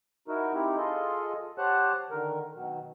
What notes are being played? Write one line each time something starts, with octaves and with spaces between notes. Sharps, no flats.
D#4 E4 F#4 A#4
C4 D#4 E4 G4
F4 G#4 A4 D#5
G4 C5 C#5 F#5 A5 F#6
D3 D#3 A#4
B2 D#3 F#3